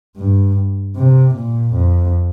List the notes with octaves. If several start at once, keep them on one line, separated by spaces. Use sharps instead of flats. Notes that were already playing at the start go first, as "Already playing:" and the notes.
G2
C3
A#2
F2